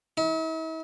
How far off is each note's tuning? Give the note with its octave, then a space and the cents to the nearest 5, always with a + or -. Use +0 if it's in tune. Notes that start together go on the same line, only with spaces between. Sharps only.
E4 -45